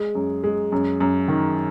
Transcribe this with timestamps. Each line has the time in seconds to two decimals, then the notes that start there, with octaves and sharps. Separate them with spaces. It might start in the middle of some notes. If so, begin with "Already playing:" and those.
Already playing: G#3
0.15 F#2
0.44 G#3
0.72 F#2
1.00 F#2
1.28 D#3